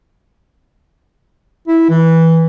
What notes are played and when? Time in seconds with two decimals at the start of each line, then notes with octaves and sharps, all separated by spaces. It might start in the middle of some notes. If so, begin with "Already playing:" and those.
1.67 E4
1.89 E3